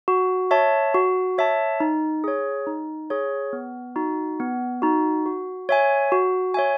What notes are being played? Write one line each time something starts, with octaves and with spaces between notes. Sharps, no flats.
F#4
C#5 E5 A5
F#4
C#5 E5 A5
D#4
G#4 C#5
D#4
G#4 C#5
B3
D#4 F#4
B3
D#4 F#4
F#4
C#5 E5 G#5
F#4
C#5 E5 G#5